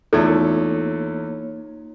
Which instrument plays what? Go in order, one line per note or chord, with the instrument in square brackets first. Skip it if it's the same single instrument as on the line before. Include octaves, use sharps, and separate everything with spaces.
[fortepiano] E2 A3 [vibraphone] A#3 C#5 [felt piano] D#4 F4 G#6 [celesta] A4